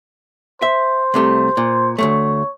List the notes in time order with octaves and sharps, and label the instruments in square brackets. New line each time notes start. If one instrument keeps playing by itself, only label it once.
[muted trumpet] C5 [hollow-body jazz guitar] E5
[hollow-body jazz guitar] C2 C3 A3
A#2
[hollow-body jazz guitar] D2 G2 A3 [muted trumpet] C#5